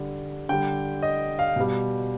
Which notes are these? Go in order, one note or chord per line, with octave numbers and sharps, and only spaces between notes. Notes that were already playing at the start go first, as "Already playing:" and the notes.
Already playing: D3 G3
D3 G3 G5
D#5
F5
B2 G3